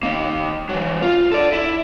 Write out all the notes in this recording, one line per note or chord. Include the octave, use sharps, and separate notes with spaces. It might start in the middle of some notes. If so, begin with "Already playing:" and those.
D#3 A#3
E3 F#3
F4
A4 D5
E4